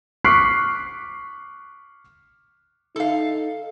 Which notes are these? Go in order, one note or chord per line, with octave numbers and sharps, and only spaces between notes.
C#6 D6 F6 F#6 B6 C7
D#4 A4 F5